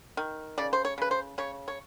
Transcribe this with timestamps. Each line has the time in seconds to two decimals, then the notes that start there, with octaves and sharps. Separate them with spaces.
0.17 D#3
0.58 C#3 D5
0.73 C5
0.85 C#5
0.98 C#3 B4
1.11 C5
1.38 C#3 C#5
1.68 C#5